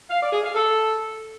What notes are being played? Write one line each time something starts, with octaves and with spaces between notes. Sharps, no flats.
F5
D5
G#4
F5
A4